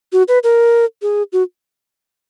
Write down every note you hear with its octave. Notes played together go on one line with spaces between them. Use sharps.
F#4
B4
A#4
G#4
F#4